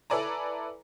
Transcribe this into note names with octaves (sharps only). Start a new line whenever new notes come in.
E4 A4 B4 D5 G#5 A#5